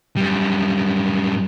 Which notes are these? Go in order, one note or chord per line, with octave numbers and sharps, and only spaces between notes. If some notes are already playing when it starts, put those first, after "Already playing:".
F#2 G3